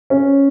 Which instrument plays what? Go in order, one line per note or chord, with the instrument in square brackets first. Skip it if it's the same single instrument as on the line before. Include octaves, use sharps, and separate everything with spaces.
[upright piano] C#4